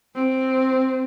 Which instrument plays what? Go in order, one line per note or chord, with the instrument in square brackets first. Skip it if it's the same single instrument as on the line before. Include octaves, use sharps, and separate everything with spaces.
[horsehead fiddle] C4